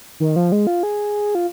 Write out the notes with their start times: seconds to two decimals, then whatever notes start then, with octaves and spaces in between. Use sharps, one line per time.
0.20 D#3
0.36 F3
0.52 G#3
0.67 F4
0.83 G#4
1.35 F4